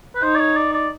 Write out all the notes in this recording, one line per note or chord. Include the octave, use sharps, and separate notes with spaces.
B4
D#4 C5
D5
C#5
D5
D5